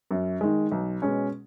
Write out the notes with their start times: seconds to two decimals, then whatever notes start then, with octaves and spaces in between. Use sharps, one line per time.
0.11 F#2
0.41 D#3 G#3
0.72 B1
1.02 B2 G#3 C#4